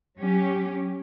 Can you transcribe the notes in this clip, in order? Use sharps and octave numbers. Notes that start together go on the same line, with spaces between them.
F#3 C#4 G4